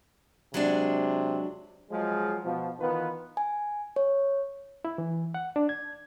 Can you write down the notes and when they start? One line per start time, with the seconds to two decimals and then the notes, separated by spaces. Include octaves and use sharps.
0.54 C3 F#3 G#3 D4
1.91 F3 F#3 G#3
2.44 B2 F3
2.80 D#3 E3 B3 F4 B4
3.37 G#5
3.96 C#5
4.85 E4
4.98 E3
5.34 F#5
5.56 D4
5.69 G#6